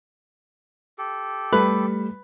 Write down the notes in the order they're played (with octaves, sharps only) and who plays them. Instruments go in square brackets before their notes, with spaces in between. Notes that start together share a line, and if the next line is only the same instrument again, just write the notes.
[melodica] G4 A4
[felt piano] G3 [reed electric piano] A3 [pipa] B4